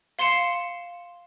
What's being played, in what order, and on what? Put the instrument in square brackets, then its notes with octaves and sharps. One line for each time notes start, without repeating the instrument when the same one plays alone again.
[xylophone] F5 C6 C7 C#7 E7